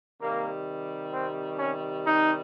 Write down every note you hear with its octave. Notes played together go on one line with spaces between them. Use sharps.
C3 D#3 G3 A#3
C4
C#4
D#4